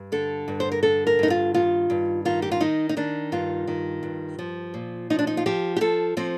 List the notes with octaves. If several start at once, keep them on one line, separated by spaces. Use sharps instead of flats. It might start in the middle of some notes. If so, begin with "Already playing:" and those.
Already playing: G2
D3 A4
G2
C5
A#4
D3 A4
A#4
G2 D#4
F4
D#3 F4
G2
D#3 F4
G4
F4
D#3 D#4
D#4
D#3 D4
G2 F4
D#3
G2
F3
A#2
F3 D#4
D4
D#4
F4
F3 G4
G4
F3 A4
F3 C4